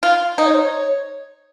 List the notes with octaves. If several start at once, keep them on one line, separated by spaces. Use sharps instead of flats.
F4 F5
D#4 D#5
C#5
C5
C#5